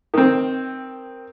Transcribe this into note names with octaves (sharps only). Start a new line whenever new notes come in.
D#3 C4